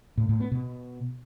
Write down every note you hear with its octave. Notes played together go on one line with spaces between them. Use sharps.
A2
A2
B3
B2